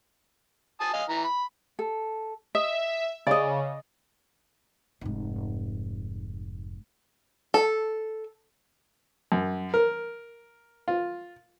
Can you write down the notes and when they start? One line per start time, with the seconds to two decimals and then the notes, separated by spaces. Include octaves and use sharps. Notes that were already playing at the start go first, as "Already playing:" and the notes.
0.81 G#5 A5 D#6
0.94 D#5 F5 G#5
1.09 E3 A#5
1.24 B5
1.79 A4
2.55 D#5 E5
3.27 C#3 D5 D#5
5.01 F1 G#2
7.54 A4
9.32 F#2
9.74 A#4
10.88 F4